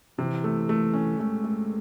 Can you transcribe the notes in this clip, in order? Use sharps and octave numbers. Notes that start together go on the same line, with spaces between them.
C3 E3
A3
A3
C#4
G#3 A3
A3